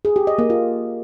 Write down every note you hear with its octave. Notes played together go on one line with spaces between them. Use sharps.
G#4
G4
D#5
A#3
F4